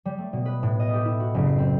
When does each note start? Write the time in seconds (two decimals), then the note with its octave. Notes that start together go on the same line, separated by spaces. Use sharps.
0.05 G3
0.18 A3
0.33 B2
0.46 B4
0.63 A2
0.80 D#5
0.93 G4
1.05 E4
1.20 F#4
1.34 F#1
1.47 C7
1.58 C4